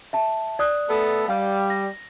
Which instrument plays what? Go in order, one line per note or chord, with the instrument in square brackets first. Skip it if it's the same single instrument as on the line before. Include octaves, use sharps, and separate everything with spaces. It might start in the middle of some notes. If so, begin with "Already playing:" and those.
[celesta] E5 A5
D5 D#6 F#6
[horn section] A3 B3 A4
[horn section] G3 [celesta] F5
[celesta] A#6